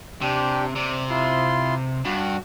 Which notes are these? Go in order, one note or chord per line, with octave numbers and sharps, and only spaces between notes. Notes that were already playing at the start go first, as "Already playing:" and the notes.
C3 D4 G4
C3 D5
E4 F4 C6
G2 F#4